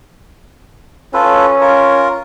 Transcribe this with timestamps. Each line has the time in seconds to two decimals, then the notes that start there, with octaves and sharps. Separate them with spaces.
1.14 C#4 F4 A4 B4
1.61 F4 A#4